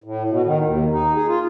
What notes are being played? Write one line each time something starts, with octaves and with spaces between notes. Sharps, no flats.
A2
B2
D#3
D#2
D#4
G#4
F4